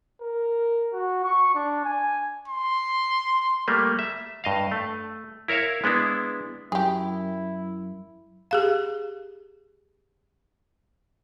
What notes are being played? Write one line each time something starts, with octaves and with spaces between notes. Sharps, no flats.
A#4
F#4
C#6
D4
G#5
C6
G3 A3 A#3
E5
G2 D#5 F5
A3
E4 A#4 C#5 E5 F5
G#3 B3 D4 E4
F#2 E4 G4 G#4
G4 G#4 F5